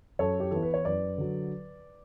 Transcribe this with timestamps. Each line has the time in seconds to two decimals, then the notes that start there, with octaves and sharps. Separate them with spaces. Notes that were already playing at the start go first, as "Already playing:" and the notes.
0.19 F#2 A4 C#5
0.40 G4
0.51 E3 B3 E4 A4
0.63 B4
0.74 C#5
0.85 F#2 B4 D5
1.18 D3 F#3